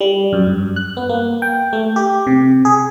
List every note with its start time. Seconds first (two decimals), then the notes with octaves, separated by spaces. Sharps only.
0.01 G3
0.33 F#2
0.47 G2
0.76 F#6
0.97 B3
1.09 A#3
1.42 G5
1.73 A3
1.96 G4
2.27 C3
2.65 G#4